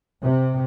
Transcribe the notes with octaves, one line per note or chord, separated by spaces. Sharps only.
C3